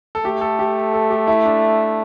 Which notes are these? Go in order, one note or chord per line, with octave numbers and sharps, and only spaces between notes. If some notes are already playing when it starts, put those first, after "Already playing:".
A4
A3 G4
A4
G4
A4
G4
E4
D4